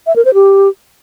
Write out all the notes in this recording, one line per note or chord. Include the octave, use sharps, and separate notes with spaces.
E5
A#4
C5
G4